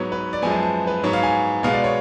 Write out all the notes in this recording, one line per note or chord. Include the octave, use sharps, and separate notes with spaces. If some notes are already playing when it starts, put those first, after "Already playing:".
Already playing: G#2 F#3 B3 C#5
B4
D5
F#2 F3 G#3 B3 G#5
A5
A5
B4
G#2 F#3 B3 C#5
F5
G#5
B2 G#3 B3 F5
D5
C#5